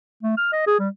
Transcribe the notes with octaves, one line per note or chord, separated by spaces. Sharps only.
A3
F6
D#5
G#4
G3